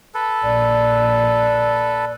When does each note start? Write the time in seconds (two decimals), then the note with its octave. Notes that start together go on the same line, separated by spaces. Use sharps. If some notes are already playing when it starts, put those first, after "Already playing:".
0.15 A4 B4
0.44 A#1 D5